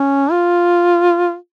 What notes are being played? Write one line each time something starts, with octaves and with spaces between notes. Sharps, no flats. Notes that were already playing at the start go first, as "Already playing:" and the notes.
Already playing: C#4
F4